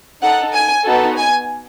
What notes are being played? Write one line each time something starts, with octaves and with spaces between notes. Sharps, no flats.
D#4 A4 F#5
G#5
B3 D#4 F#4 A4
G#5